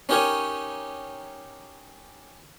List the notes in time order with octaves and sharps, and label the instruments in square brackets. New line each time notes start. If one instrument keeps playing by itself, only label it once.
[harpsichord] C#4 D#4 G4 A#4 C#5